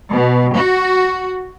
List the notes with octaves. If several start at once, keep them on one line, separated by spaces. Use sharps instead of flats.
B2
F#4